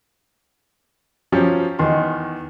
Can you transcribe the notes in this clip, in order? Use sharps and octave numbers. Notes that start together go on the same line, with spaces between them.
F3 F#3 C#4 G4
E2 D#3 C6